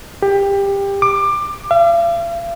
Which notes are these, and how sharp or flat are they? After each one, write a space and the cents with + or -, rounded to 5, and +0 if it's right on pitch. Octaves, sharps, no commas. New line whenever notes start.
G4 +20
D6 +20
F5 -45